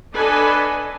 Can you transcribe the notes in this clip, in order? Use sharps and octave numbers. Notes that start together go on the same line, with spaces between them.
D4 A4 B4 D#5 G#5